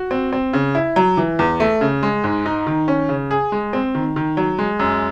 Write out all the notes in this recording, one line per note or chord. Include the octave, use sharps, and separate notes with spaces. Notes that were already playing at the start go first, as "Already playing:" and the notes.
Already playing: F#4
C4
C4
C#3
E4
F#3
E3
E2
A3
C#3
G#3
G#2
D#4
D#3
C#4
C#3
G#4
G#3
C4
D#3
D#3
F#3
G#3
F#2